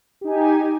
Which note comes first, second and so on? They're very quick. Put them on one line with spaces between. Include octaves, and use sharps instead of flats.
G4 D#4 G#5